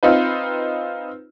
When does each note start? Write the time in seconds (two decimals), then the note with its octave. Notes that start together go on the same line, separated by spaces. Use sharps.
0.03 C4 D#4 F4 B4